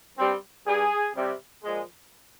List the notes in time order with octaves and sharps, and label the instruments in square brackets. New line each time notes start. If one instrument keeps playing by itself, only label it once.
[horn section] G2 G3 C4
G2 G3 G#4
C3 G3
A#2 F3 G#3